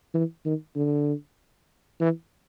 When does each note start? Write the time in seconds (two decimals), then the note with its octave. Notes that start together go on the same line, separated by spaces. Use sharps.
0.14 E3
0.45 D#3
0.76 D3
2.00 E3